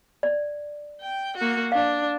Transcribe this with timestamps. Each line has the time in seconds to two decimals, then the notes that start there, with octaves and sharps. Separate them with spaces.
0.23 D5
1.01 G5
1.37 A#3 F#4
1.72 D4 F5